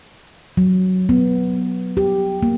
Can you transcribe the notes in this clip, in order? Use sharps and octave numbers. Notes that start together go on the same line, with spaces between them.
F#3
B3
G4
A#3